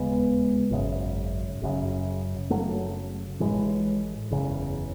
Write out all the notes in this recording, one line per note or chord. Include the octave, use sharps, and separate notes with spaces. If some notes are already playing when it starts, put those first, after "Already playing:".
Already playing: E1 D#2 C#3 G#3 B3
G#1 F#2 C#3
F#1 F#2 C#3
F#1 F#2 C#3 F#3 A3
A1 A2 E3 G#3
F#1 E2 C#3